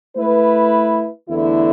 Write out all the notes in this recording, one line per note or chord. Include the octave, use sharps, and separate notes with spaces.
A3 E4 B4
E2 D3 A3 E4